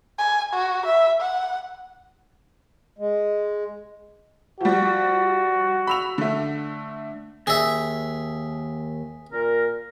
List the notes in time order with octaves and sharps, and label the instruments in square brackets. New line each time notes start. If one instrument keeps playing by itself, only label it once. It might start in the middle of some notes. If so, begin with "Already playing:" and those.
[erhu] G#5
F#4
E5
F#5
[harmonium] G#3
[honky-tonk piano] F3 G3 [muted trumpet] F#4
[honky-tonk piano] B5 E6 F7
D3 A3
[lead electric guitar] D#2 [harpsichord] G#4 E5
[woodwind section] A#2 A#4